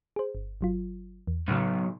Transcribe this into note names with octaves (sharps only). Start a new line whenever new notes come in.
G#4 C5
G1
G1 F#3 F4
E2
B1 A2 C#3